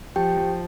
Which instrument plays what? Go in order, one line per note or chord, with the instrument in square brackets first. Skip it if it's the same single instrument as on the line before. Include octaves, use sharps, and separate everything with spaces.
[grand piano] F3 [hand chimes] G4 G5
[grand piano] F3